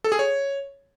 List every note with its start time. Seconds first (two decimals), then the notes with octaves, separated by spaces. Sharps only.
0.04 A4
0.12 G#4
0.19 C#5